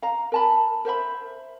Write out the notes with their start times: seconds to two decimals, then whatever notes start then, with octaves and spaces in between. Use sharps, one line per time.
0.02 F5 A#5
0.32 A#4 A5 B5
0.85 A#4 C5 E5 B5